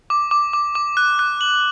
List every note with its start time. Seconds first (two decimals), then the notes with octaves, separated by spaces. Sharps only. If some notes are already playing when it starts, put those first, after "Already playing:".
0.10 D6
0.31 D6
0.53 D6
0.75 D6
0.97 F#6
1.19 F#6
1.41 F#7